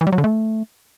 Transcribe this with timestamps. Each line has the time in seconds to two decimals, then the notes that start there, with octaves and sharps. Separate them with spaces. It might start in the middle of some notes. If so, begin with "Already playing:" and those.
0.01 E3
0.07 G3
0.12 F#3
0.18 D3
0.24 A3